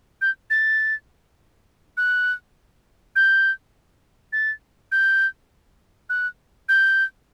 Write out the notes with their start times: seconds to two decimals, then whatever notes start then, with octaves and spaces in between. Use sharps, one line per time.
0.21 G6
0.50 A6
1.97 F#6
3.16 G6
4.33 A6
4.92 G6
6.09 F#6
6.69 G6